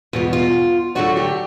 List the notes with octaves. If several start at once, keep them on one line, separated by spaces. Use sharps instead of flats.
E2 B2 G3 F4
F4
D3 F#3 A3 D4 F#4
G4